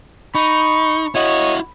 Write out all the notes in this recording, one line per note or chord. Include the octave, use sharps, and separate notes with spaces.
D#4 B5 C#6
E4 F#4 C#5 D#5